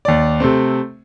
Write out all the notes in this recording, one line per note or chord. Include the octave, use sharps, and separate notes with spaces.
D#2 D5
C3 A3 C4